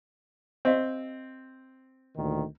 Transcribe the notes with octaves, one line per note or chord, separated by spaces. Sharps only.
C4 G4 D#5 F5
D2 A#2 D#3